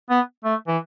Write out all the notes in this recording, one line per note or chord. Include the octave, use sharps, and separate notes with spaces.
B3
A3
E3